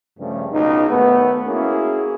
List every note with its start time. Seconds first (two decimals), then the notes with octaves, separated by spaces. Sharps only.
0.19 G2 C#3 F3 G3 A3
0.53 C#2 B2 D#4
0.89 D#2 A3 B3
1.47 A#3 C#4 E4 F#4 G#4